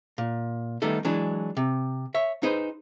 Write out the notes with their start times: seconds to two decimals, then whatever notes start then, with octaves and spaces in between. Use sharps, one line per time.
0.18 A#2
0.82 D#3 G3 A3 B3 D#4 A4
1.05 E3 F#3 G#3 D4
1.57 C3
2.14 C#5 E5
2.43 D#4 G#4 B4 C5